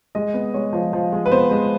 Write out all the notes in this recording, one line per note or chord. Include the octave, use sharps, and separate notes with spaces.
G#3 D#5
B3
G#3 C#5
F3
F3
G#3
B4
B3 C5
G#3